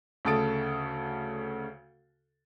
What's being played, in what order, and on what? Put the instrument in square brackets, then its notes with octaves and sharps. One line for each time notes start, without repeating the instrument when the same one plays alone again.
[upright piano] D2 C#3 A4 D#6 A6 D7